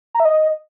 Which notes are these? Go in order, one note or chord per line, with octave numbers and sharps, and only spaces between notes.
A#5
E5
D#5